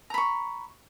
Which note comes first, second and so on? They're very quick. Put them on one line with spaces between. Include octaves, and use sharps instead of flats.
A#5 B5 C#6